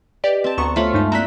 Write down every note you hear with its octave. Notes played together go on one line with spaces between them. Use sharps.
G4 B4 D5 D#5
C4 A5
D2 B3 A#5 C#6
A3 F4 C5 C#5 B5
G2 G#3 D#4 A5
A#3 C4 E4 D5 A#5 F#6 B6